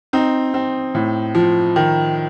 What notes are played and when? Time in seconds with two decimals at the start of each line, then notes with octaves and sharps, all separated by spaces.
0.13 C4 D#4
0.54 C4
0.95 A2
1.35 F3
1.76 D#3